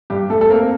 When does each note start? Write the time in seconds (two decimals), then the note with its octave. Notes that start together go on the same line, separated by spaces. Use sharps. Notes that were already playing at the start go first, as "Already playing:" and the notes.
0.10 G2 G4
0.30 A3 A4
0.41 A4
0.50 A#3 C4 A#4